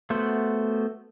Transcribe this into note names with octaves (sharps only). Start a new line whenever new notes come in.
A3 B3 F#4 C5